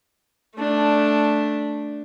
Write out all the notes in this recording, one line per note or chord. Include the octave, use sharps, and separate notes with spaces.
A3 D4